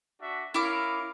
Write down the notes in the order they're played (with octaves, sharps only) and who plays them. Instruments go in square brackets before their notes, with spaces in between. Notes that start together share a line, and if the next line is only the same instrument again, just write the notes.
[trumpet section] D4 F#4 E5
[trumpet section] C#4 A#4 F5 [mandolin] E4 D6